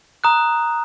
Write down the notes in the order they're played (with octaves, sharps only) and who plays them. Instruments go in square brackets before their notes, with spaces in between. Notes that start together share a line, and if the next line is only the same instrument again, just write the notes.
[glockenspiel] A#5 D#6 F#6